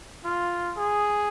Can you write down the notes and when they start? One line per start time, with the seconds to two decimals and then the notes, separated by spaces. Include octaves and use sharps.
0.25 F4
0.77 G#4